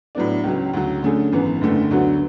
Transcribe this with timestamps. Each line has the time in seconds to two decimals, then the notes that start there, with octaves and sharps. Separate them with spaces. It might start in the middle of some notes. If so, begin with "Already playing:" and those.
0.15 A2 F#3 B3 D4
0.44 C#2 C#3 F#3 C#4
0.73 D2 C#3 F#3
1.02 D3 A3 C#4 G#4
1.32 G#1 F#2 E3 B3
1.61 F#1 F#2 D3 A3
1.91 D2 D3 F#3 B3 F#4